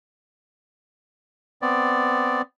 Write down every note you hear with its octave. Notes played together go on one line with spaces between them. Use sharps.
B3 C4 D5